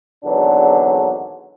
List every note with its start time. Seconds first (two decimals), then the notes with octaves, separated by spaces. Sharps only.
0.24 G#1 E2 B2 D3 F#3 D4